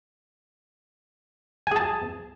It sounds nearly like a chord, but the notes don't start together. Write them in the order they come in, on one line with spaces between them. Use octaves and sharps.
G#5 G#4 A5